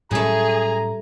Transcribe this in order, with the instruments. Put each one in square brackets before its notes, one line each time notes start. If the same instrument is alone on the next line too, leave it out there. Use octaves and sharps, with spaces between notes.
[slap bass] A2 F#3 C#4 [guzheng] G3 A3 [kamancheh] G#4 [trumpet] A#5